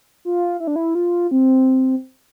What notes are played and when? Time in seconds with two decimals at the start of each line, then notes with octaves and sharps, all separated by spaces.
0.25 F4
0.60 E4
0.67 D4
0.76 E4
0.95 F4
1.31 C4